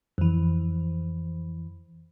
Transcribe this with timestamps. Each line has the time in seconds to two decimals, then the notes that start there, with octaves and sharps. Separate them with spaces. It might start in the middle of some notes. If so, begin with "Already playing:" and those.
0.18 F2 E3